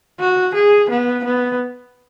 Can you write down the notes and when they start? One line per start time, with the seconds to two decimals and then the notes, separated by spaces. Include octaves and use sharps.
0.20 F#4
0.54 G#4
0.90 B3
1.24 B3